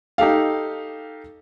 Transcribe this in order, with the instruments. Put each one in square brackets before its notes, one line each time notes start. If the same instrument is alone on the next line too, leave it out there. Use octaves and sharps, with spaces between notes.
[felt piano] D#4 G4 A4 F5